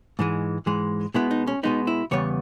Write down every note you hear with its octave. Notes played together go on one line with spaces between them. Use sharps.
G#2 E3 G#3
G#2 E3 G#3
B2 G#3 B3 E4
D#4
C#4
B2 G#3 B3 D#4
E4
E2 C#3 G3 B3 C#5